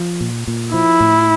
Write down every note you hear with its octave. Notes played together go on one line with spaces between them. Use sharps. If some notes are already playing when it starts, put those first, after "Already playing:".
Already playing: F3
A#2
A#2
F3 E4
A2